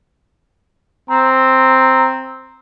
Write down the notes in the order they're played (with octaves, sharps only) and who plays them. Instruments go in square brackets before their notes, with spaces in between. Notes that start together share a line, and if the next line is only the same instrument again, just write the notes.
[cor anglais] C4 [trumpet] A#5